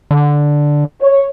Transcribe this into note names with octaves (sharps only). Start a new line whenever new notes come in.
D3
C#5